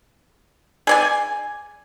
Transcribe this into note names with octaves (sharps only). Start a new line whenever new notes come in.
G#4 D5 G#5